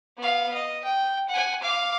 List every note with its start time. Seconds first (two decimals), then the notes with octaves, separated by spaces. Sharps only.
0.18 B3 F5
0.54 D#5
0.84 G5
1.29 F#5 G#5
1.61 F5 D6